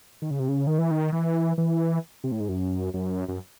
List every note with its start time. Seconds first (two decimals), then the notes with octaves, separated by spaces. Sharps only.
0.22 D#3
0.31 C#3
0.39 C3
0.48 C#3
0.67 D#3
0.78 E3
0.91 D#3
1.12 E3
1.58 E3
2.24 C3
2.32 A2
2.40 G#2
2.49 F#2
2.94 F#2
3.28 F#2